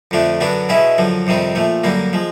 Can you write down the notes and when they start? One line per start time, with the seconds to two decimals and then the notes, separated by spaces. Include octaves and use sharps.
0.11 F2 D3 F3 A3 D4
0.41 F#2 D3 F#3 B3 D4
0.69 B2 G#3 C#4 E4
0.98 F#2 D3 F3
1.27 F2 C3 D#3 G3 C4
1.55 A#2 F3 A3
1.84 F#2 D3 G3 A#3
2.13 F3 G#3